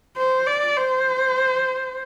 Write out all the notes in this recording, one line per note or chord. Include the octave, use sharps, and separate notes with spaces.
C5
D5
C5